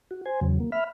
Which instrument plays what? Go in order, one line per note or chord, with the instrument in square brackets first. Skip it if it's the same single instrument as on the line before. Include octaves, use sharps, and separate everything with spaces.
[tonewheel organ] F#4
C5 G#5
E2 C#3 F#3
A#3
E5 B5 F6